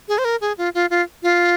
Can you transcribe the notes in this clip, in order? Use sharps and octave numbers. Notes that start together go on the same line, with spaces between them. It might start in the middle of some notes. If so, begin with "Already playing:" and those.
G#4
C5
A#4
G#4
F4
F4
F4
F4